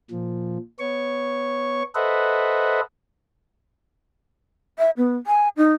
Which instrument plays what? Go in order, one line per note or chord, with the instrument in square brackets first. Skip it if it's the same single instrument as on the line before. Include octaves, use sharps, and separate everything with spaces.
[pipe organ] A#2 F3
B3 C#5 C#6
A4 B4 C5 D#5 E5 F#5
[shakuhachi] E5
B3
G#5
D#4